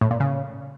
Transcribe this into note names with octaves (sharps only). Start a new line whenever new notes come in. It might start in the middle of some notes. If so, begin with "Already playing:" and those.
A2
A#2
C#3